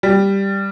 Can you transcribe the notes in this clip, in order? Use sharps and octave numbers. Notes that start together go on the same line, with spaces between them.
G3